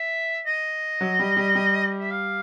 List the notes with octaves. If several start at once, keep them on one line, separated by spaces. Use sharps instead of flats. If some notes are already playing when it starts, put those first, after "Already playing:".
Already playing: E5
D#5
F#3
G3
G3
G3
E5
F5